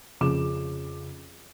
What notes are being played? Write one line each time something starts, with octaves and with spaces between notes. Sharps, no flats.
F2 C#3 G#4 D6 E7